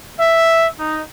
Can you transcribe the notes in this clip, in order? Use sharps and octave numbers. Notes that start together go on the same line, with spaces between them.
E5
D#4